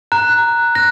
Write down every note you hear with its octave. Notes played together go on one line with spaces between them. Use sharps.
A#5 F#6
F#6 A#6